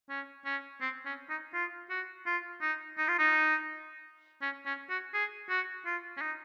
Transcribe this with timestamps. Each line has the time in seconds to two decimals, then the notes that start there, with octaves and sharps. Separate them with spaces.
0.10 C#4
0.45 C#4
0.81 C4
1.06 C#4
1.29 D#4
1.54 F4
1.90 F#4
2.26 F4
2.62 D#4
2.98 D#4
3.08 F4
3.19 D#4
4.42 C#4
4.66 C#4
4.90 F#4
5.14 G#4
5.50 F#4
5.85 F4
6.17 C#4
6.22 D#4